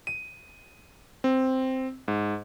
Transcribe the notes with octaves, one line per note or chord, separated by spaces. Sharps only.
D#7
C4
G#2